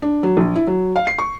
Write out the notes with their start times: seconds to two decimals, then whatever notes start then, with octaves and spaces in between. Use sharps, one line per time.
0.02 D4
0.23 F#3
0.37 A#1
0.56 E4
0.67 F#3
0.96 F5
1.07 C7
1.18 C#6